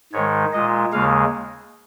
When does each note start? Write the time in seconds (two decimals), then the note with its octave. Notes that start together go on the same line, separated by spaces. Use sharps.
0.13 G#2 D#3 G#3 C#5
0.53 A#2 G#3 D#5
0.93 D#2 C#3 G#3 F5